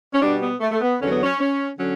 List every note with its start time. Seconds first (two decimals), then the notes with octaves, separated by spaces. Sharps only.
0.14 C#4
0.21 B2 G3 D4
0.41 B3
0.61 A3
0.71 A3
0.81 B3
1.00 E2 D3 F#3 C#4
1.11 B3
1.23 C#4
1.40 C#4
1.79 D3 F#3 C#4